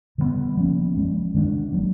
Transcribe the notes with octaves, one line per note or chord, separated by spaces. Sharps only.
D3 G3 B3 D4
F3 A#3 C#4
F3 G#3 C#4
D#3 G#3 B3 D4
D#3 F#3 A#3